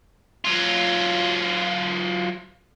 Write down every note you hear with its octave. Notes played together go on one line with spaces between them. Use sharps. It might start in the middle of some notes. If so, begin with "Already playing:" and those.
F#3 F4